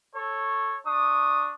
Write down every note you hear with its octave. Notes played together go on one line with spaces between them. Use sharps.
A4 C#5
D4 C#6 D#6